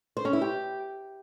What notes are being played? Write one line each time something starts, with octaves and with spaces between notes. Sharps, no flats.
C5
C#4
E4
G4